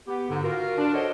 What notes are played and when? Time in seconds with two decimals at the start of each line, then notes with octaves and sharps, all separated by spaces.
0.08 B3 G4
0.29 G#2 D3
0.43 F4 F#4 A#4
0.78 D4
0.93 F#4 A4 C5 C#5 D#5